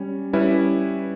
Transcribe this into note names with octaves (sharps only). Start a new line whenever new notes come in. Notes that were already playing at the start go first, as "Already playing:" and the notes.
Already playing: G3 C#4
G3 C#4 E4 B4